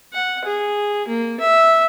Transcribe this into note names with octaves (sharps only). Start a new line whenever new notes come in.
F#5
G#4
A#3
E5